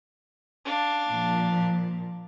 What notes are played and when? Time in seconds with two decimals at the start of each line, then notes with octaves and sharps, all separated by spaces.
0.65 D4 F5
1.08 A#2 F3